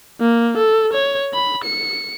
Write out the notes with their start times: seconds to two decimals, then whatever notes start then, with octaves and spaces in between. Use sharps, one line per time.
0.21 A#3
0.57 A4
0.93 C#5
1.34 B5
1.64 C#7